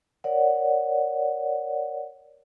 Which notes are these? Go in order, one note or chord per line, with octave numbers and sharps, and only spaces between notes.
A#4 C#5 D5 F#5